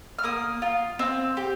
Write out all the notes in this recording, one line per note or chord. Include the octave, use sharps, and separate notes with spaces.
F6
A#3 D#6
F4
C4
G4